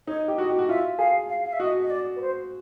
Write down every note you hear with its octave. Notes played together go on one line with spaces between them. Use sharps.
D#4 C#5
G4
F#4 D#5
G4
F#4
F4 E5
G#4 F5
F5
F5
E5
F#4 D#5
D#5
D5
B4
C5